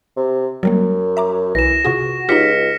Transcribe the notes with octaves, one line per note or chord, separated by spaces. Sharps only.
C3
F#2 F#3 G3 A#3
E5 A#5 D6
B1 E3 A#6 E7
C3 F4 F#4 G#4
C#2 D#4 F4 G4 F6 B6 C#7